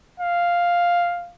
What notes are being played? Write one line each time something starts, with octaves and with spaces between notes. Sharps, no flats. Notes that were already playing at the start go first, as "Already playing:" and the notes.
F5